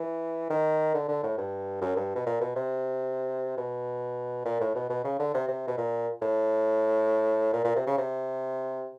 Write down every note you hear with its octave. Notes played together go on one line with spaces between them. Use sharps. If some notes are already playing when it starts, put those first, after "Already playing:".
Already playing: E3
D#3
D3
D3
A2
G2
F#2
G2
B2
A#2
B2
C3
B2
A#2
A2
B2
B2
C#3
D3
C3
C3
B2
A#2
A2
A#2
A#2
C3
C#3
C3